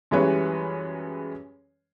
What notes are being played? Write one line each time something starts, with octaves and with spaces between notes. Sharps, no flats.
F#2 E3 G3 G#3 B4 C#5